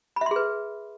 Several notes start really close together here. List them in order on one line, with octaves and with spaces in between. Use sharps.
B5 E5 C6 G#4 B4